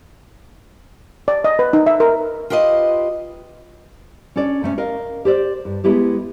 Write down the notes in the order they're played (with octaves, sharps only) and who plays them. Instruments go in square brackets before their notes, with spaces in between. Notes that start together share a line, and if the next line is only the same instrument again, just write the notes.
[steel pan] D5
D#5
B4
D#4
E5
A#4
[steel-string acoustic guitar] F4 G4 B4 C5 D#5
[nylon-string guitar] C#4 D4 A4 D5
C3 A3 C4 C#4
A#4 D#5 F5
G4 C5 D5
G2
G#3 B3 E4 G4 A4